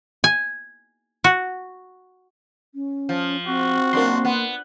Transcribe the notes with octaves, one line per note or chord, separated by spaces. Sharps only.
G#5
F#4
C#4
F3
C4 F#4
F#2 A#3 D4 C6
B3